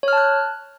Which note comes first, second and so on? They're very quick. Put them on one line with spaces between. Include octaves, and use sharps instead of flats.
C#5 F6 A5 F#6